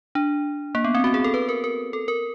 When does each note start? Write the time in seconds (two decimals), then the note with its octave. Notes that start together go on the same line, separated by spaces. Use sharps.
0.15 D4
0.75 A#3
0.84 B3
0.95 C4
1.04 F#4
1.14 G#4
1.24 A4
1.34 B4
1.49 A#4
1.64 A#4
1.93 A4
2.08 A#4